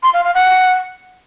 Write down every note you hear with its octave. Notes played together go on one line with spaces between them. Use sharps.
C6
F5
F5
F#5